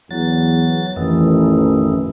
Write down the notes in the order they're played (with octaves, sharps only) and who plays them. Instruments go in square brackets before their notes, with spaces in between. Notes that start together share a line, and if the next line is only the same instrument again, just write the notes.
[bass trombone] E2 [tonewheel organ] F#3 A6
[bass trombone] A1 [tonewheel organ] F2 D#3 E3